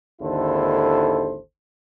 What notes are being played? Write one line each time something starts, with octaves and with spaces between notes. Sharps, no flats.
G#1 D#2 D3 E4 A4 C5